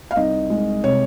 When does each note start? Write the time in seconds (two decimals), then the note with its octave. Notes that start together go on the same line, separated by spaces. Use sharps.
0.11 F5
0.16 C2 D#4 D#5
0.50 G#3
0.84 C3 C#5